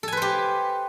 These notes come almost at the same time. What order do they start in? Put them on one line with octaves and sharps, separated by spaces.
A4 G#5 B4 C5 G4